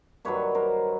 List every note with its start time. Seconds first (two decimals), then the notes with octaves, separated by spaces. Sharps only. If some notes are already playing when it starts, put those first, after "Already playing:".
0.25 G2 D#3 F#3 B4 C#5
0.55 A#4 C5